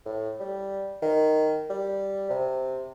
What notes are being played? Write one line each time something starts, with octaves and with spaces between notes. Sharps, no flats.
A2
G3
D#3
G3
C3